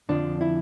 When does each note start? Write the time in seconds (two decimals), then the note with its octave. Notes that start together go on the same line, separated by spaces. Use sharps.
0.09 F2 D3 F3 D4
0.41 E4